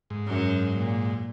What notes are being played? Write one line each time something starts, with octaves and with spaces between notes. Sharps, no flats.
G#2
F#2 F#3
A#2